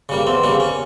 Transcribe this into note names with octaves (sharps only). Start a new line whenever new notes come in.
C#3 G3 A#3
E2 C4
C#3 G3 A#3
C#4